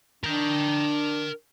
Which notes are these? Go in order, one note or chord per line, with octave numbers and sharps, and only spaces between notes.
D4 A#4 G5